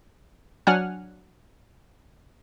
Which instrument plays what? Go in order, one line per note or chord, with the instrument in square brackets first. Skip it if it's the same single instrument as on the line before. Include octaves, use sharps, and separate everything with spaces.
[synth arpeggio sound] F#3 D4 F#5 G#5 F6